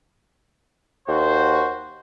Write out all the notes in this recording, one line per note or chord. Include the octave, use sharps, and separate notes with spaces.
D#2 F#4 C5